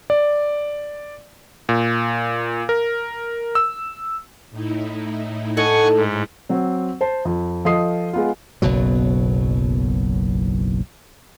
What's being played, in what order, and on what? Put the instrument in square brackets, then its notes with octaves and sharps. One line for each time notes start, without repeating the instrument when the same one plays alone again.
[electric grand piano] D5
A#2
A#4
E6
[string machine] A2 D#4 E4
[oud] A4 D#5 [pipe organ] F#5 G#5 C#6
[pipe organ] G#2
[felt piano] F#3 C4
C5 A5
F2
F3 A4 D#5 D#6 C7
G#3 B3 F4
[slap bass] F#1 B1 B2 F#3